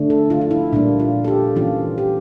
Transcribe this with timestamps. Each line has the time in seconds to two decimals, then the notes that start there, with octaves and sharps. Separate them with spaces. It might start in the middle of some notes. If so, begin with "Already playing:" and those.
Already playing: D3 A3 D4
0.10 A4
0.30 F4
0.41 F4
0.51 E4
0.72 A#2 G3 A#3 D4
1.00 F4
1.24 A4
1.28 G4
1.56 E3 A#3 C#4 F4
1.98 G4